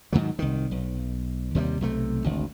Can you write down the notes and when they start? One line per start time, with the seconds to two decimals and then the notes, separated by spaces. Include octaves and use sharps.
0.13 G#2 B2 D#3 F#3
0.39 C2 D#3
0.71 B1
1.55 D#2 C3 E3 G3
1.81 B1 C3 A3
2.24 G#1 D2